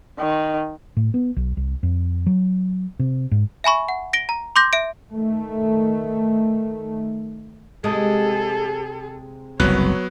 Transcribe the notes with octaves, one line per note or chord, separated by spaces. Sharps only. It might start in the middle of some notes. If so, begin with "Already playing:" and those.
D#3
A2
B3
B1
C2
F2
F#3
C3
G#2
E5 G#5 B5 C#6
F#5
A#6 D7 G7
A#5
C6 D6 G6 A#6
E5 D7
D#3 A3
C3 G#3 G#4 A4
F#1 C2 F#3 B3 C#5 F#6